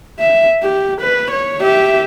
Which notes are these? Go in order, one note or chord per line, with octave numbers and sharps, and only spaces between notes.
E5
G4
B4
C#5
G4 E5